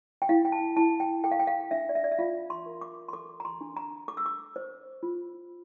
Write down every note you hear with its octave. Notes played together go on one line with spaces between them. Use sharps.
G5
E4 F5
G5
A5
E4 A5
G5
A4 G5
F5
G5
F5
D4 E5
D5
E5
D5
E5
F4 F5
C6
A#4
D6
C6
A4 D6
A#5
C6
D4
A#5
A4 D6
E6
D6
C5
F4